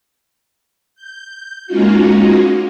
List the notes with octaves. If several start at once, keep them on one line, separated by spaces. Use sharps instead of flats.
G6
G#3 A#3 C#4 D#4 F4 F#4